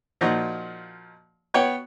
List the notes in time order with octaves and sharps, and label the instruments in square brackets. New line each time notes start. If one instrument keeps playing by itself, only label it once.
[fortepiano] A#2 F3 D#4 F#4
B3 C#5 F#5 G5